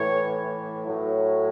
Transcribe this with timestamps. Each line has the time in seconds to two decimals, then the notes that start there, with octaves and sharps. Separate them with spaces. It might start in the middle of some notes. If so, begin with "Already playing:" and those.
Already playing: A2 E3 C#5
0.86 A2 F#3